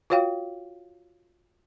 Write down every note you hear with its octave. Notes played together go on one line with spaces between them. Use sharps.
F4 F#4 C#5 F5 G5